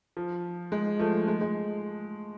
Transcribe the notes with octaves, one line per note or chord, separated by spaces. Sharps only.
F3
G#3
F3 A3
G#3
G#3